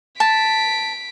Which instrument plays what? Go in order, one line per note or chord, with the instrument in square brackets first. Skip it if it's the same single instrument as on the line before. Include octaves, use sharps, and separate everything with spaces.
[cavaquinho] A5 [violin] B6 D7